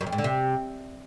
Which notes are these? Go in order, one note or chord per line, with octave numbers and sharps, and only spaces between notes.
F#2
F2
G#2
D3
C3